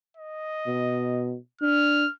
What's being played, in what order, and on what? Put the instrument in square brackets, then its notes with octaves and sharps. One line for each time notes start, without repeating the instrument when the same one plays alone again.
[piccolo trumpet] D#5
[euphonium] B2
[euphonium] D4 [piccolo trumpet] F6